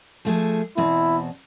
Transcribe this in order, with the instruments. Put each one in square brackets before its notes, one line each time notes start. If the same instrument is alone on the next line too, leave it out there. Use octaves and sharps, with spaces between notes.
[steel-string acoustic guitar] F3 A3 G#4
[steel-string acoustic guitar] E2 B2 C4 [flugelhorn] E4